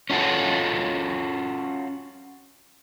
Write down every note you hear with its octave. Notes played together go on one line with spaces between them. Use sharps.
C#4 F4 F#4 A4